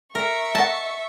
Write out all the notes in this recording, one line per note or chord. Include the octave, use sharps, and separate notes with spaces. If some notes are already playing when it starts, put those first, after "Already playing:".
A#4 E5 C#6
D#5 F#5 A5